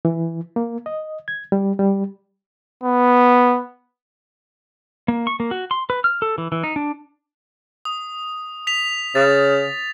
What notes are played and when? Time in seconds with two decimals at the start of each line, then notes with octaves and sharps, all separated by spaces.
0.05 E3
0.56 A#3
0.86 D#5
1.28 G#6
1.52 G3
1.79 G3
2.83 B3
5.08 A#3
5.27 C#6
5.40 A#3
5.51 F#4
5.71 C6
5.90 B4
6.04 F6
6.22 A4
6.38 E3
6.52 E3
6.63 D#4
6.76 D4
7.85 D#6
8.67 B6 F7
9.15 C#3 A6